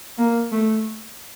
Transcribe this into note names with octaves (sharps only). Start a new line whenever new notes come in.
A#3
A3